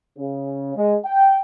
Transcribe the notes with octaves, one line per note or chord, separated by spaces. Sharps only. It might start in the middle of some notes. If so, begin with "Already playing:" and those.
C#3
G#3
G5